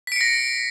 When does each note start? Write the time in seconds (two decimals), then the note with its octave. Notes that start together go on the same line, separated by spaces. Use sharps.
0.07 B6
0.12 D7
0.16 C#7
0.21 A#6